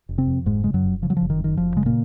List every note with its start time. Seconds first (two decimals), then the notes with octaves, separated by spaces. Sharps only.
0.09 F1
0.18 C3 C4
0.27 F2
0.46 F1 G#2 G#3
0.64 C#3 G#3
0.74 F#2 F#3
0.83 F1
1.02 C#3 F3
1.10 F#3
1.17 F#1 F3
1.30 D#3
1.39 F#2
1.44 D#3
1.57 F#1 F3
1.76 C#3 G#3
1.86 A#2 A#3